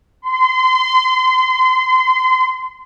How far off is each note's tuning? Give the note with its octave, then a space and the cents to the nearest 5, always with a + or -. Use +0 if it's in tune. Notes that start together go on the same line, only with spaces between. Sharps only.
C6 -30